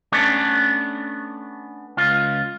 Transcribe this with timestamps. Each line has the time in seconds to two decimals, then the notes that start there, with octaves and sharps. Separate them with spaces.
0.12 A3 B3 C#4 D4
1.97 C#2 F4